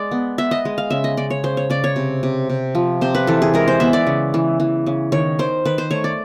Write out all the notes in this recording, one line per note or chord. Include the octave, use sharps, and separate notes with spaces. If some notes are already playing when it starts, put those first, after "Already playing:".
Already playing: G#3 D5
B3
B3 E5
D#5
G#3
F5
C#3 E5
D#5
C#3 D5
C#5
C#3 C5
C#5
C#3 D5
C#5
C3
C3
C3
F3
C3 C5
B4
E3 A4
G#4
G#3 A#4
C5
B3 E5
D5
C#3
E3
E3
C#3
D#3 C#5
D#3 C5
D#3 B4
C5
A3 C#5
D5